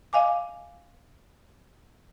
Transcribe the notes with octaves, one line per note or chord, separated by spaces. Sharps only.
D#5 F5 G#5 D6